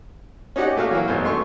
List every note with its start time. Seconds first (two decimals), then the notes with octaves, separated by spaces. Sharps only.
0.56 C#4 D#4 F#4 G4 D5 F#5
0.76 A#2 A3 F#4 F5
0.91 E3 F#3 A#3
1.08 G#1 B2 G#4 C5
1.23 G2 A3 C6 C#6